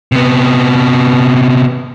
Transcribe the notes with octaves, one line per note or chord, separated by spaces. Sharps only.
C3 B3